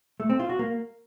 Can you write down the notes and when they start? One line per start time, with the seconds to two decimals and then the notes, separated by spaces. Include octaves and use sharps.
0.20 A3
0.30 C4
0.39 F4
0.49 F#4
0.59 A#3